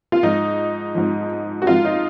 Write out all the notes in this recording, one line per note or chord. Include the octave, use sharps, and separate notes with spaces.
F4
G#2 F3 D#4
G#2 F3
F#4
G#2 F3 F4
D#4